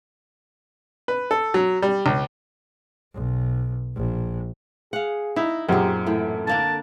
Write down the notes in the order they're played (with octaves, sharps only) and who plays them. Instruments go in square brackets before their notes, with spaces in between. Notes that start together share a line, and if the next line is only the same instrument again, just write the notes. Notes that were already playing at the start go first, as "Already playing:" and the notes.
[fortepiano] B4
A4
F#3
G3
C#2
[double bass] B1
A#1
[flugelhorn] G#4 [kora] F5 F#5
[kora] D#4 [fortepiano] E4
[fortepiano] F#2 A#2 [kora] C4 G#4 [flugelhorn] G4
[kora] A2 E3 G5 [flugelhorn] A4
[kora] D3 A#3 D4 [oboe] A5